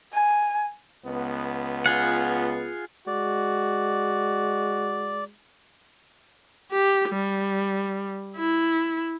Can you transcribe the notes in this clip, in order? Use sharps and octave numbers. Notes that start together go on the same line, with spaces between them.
G#5
C#2 B3
F4 G#4 F#5
G#3 F#4 D5
G4
G3
E4